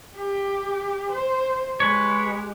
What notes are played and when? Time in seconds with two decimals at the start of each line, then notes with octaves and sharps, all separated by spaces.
0.15 G4
1.11 C5
1.80 G#3 G4 B4 C#5